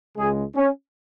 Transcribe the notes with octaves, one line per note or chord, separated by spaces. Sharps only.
C#2 C#3 G#3 G#4
C#4